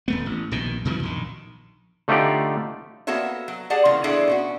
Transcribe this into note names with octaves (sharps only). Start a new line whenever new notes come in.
D#1 A3 B3
A1
A#1 B2 D#3
F#2 B2 E3 F3
A#1 D#3
D3 A3 D#4 F4 G4 D5
A#3 B3 F#4 A4 C#5 E5
F#3
G4 G#4 D5 F#5 A5
C#3 E3 F3 A#3
E3 B3 D4 G#4 A4 E5
B2 C#4 F#4